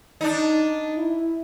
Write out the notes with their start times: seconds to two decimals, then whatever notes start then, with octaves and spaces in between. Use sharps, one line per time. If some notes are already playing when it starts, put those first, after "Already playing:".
0.21 D4 D#4
0.97 E4